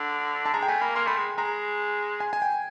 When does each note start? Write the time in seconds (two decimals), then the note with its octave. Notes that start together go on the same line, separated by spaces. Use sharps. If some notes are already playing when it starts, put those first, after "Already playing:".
Already playing: D3
0.46 A5
0.53 G#3 A#5
0.63 G5
0.68 A3 G#5
0.81 A#3 B5
0.95 A#3 C6
1.07 A3 B5
1.17 G#3
1.38 G#3 A#5
2.20 G#5
2.33 G#5
2.42 G5